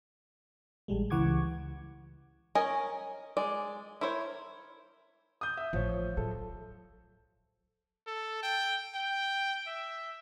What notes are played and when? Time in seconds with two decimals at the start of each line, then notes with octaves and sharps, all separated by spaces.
0.88 A1 G3 G#3
1.10 C#2 E3 F#5 C#6 D6 G#6
2.55 C#4 A#4 C#5 D#5 G#5
3.37 G#3 D5
4.01 E4 A#4 C5 C#5
5.41 D#6 G6
5.57 E5
5.73 A1 F3 C#5
6.17 F#3 A4
8.07 A4
8.43 G5
8.95 G5
9.67 E5